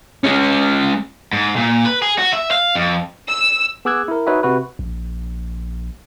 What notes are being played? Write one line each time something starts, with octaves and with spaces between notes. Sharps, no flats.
G#3 C#4
G#2
A#2
B4
G#4
F#4
E5
F5
F2
E6
B3 G#4 D6 E6 F#6 G#6
E4 A#4
D#4 F#4 B4 C#5 D#5 E5
C3 F#4 B4
A#1